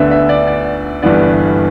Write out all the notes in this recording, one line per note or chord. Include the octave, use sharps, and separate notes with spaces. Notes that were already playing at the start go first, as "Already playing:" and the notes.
Already playing: D2 D3 B3 E5
E5
D5
D5
G1 G2 E3 B3 D5